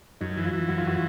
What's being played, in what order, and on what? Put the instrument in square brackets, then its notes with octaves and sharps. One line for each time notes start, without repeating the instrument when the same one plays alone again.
[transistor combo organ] F#2 [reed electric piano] D#4
[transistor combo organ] E3
[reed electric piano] F4
[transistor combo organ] E3
[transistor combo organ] F#2 [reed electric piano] F#4
[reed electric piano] F4
[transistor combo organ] E3 [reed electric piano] F#4